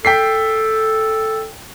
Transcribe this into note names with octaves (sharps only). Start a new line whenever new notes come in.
A4 G5 B6 C7